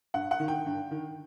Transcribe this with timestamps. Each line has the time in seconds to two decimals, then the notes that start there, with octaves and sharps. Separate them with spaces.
0.14 G2 F#5
0.31 F#5
0.40 D#3
0.48 G5
0.66 G2
0.91 D#3